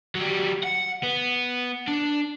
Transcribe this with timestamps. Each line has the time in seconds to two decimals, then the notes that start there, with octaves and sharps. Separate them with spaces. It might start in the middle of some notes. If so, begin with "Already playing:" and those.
0.15 F#3 G3
0.63 F#5
1.03 B3
1.88 D4